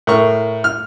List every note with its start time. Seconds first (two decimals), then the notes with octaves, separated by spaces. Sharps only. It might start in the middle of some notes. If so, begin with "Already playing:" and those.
0.07 A2 A#4 C#6
0.64 F6